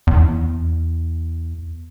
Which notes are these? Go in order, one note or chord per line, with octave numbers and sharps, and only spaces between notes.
E2